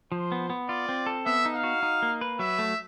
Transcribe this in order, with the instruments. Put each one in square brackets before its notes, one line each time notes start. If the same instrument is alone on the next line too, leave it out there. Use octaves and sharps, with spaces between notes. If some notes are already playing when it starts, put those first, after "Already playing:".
[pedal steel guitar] F3 [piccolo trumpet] C5
[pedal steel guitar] B3
B3
[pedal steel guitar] F4 [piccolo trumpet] D5
[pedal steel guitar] C4
A4
[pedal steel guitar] B3 [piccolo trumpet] E5
[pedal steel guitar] D#4
[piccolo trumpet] F5
[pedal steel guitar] F#4
D#4
A#3
B4
[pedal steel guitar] F#3 [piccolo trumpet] E5
[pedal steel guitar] A3